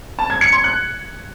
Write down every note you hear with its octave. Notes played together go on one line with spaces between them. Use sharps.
A5
G#6
C#7
C6
F#6